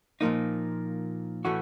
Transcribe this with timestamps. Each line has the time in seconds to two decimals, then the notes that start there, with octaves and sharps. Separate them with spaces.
0.21 A#2 F3 A#3 D#4
1.45 A2 E3 A3 C#4 F#4